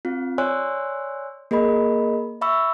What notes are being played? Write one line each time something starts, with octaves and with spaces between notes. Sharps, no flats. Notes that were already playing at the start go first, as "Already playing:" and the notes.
C4 F4
C#5 D5 G#5 C6 E6 F#6
A#3 G#4 A#4 D#5 B5
E5 B5 C#6 E6